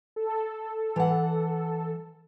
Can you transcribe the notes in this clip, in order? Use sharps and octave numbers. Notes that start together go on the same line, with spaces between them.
A4
E3 F#5